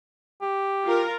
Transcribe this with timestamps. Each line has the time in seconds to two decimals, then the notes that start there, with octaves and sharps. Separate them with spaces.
0.42 G4
0.84 F4 A#4